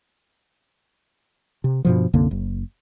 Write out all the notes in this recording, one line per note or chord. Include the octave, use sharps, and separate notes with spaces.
C3
G2 B2 F3
C2 F#2 D3 A#3
F#1